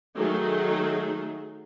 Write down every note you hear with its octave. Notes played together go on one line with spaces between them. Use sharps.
D#3 F#3 A3 D#4 G#4